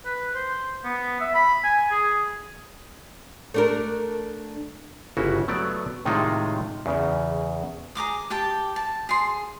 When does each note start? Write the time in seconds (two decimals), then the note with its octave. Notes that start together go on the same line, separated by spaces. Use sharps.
0.05 B4
0.35 C5
0.84 B3
1.21 E5
1.34 B5
1.63 G#5
1.91 G#4
3.54 A3 D4 A#4
5.17 G1 C#3 E4 F#4
5.48 F#3 A3 B3 D5
6.05 A2 C3 D#3 G#3 D#4 F4
6.86 E2 C#3
7.95 G#4 A#5 D6 D#6
8.30 G4 G5 A5 D6
8.76 A5
9.09 G#4 C6